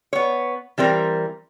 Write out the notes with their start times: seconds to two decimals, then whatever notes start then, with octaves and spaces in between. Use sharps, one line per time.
0.13 B3 C#5
0.78 E3 G3 C4 A#4